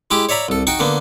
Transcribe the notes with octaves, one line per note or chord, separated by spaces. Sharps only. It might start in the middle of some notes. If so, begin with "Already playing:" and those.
G#3 E4 G4 D6
C#5 D5 E5 A#5 B5
C2 A4
D#4 F#4 G5 C#6
D3 A#3 B3